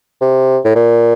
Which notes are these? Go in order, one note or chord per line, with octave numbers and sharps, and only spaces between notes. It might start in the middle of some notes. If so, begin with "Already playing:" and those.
C3
A2
A#2